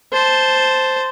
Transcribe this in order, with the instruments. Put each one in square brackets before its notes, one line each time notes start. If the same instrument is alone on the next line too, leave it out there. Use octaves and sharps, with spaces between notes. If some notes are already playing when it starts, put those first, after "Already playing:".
[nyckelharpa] C5 A5